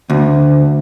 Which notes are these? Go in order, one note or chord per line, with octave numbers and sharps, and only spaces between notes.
D2